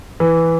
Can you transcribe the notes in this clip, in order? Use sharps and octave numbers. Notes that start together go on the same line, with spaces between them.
E3